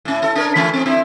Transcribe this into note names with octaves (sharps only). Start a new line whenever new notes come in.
A2 C#4
E4 A4
D4 A#4 C#5
E3 A3 C#4
C4 D#4
C4 D4 E4